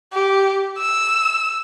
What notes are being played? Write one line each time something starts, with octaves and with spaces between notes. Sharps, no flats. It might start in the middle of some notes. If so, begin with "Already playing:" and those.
G4
E6